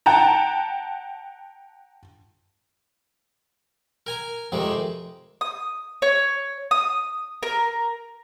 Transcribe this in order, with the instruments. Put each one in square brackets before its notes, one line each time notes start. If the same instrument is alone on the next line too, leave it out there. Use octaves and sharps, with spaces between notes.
[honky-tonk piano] F#5 G5 A5 A#5
[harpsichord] A#4 G#5 A#5
F2 C3 D#3 G#3
[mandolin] D#6
C#5
D#6
A#4